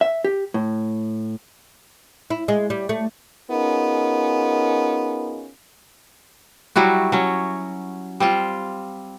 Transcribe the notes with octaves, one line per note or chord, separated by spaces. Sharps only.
E5
G4
A2
E4
G#3
G3
A3
B3 C#4 D#4 F4 G#4 A#4
F#3 G3 E4 F#4
F#3 C#4
G3 C4 F4